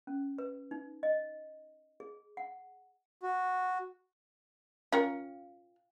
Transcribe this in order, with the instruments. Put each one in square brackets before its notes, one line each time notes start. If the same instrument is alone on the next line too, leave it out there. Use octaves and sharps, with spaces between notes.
[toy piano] C#4
B4
D#4
D#5
G#4
F#5
[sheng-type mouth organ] F#4
[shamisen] C#4 F4 A#4 [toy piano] F5 G5